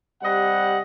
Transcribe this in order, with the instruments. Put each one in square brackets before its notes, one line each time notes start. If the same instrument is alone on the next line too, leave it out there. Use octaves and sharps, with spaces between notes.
[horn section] C3 G3 D#5 F#5